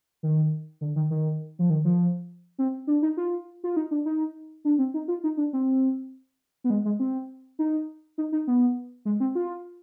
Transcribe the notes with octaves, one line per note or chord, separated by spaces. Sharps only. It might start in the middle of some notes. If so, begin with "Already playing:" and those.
D#3
D3
D#3
D#3
F3
D#3
F3
C4
D4
D#4
F4
F4
D#4
D4
D#4
D4
C4
D#4
F4
D#4
D4
C4
B3
G#3
G#3
C4
D#4
D#4
D#4
B3
G#3
C4
F4